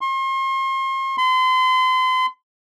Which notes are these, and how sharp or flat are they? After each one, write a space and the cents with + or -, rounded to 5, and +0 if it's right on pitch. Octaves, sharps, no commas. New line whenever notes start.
C6 +40
C6 -35